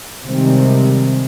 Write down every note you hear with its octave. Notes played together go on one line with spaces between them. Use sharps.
C3 D#3 G3 G#3 C4